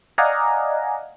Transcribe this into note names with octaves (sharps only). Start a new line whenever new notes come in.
D5 D#5 F5 F#5 G#5 A#5